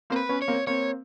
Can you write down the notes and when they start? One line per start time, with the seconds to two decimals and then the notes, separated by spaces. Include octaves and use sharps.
0.10 A#3 C4 C5
0.16 B4
0.29 B3 C#4
0.42 C#5
0.48 A#3 C4
0.67 A#3 C4 C#5